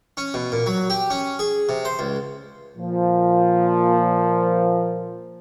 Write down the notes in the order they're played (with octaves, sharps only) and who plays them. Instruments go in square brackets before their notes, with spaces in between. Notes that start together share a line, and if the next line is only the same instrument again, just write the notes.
[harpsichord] C#4
B2
A#2
F#3
G4
C#4
G#4
C3
C5
C#2
[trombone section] A#2 F3